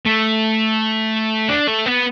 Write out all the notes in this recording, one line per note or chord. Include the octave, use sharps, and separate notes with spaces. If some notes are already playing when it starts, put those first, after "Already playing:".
A3
D4
A3
B3